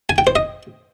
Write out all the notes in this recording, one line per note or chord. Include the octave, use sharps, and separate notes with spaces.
G#5
G5
C5
D#5